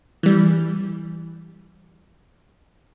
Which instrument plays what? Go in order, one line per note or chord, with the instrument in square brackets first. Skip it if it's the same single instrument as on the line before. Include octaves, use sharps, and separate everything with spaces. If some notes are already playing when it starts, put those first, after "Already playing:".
[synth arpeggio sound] E3 G3